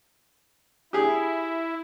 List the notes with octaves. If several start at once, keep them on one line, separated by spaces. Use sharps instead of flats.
E4 G4 G#4